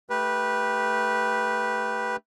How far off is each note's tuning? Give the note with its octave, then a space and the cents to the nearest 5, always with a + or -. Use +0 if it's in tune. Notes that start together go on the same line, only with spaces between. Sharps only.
A3 +0 G4 +5 B4 -15